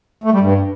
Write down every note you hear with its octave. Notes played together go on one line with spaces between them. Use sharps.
A3
G3
G2